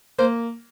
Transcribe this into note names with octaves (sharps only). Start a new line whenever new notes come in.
A#3 C5